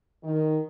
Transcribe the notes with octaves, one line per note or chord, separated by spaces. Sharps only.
D#3